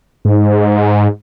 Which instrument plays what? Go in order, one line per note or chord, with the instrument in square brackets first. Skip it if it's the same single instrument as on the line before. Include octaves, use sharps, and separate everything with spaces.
[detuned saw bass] G#2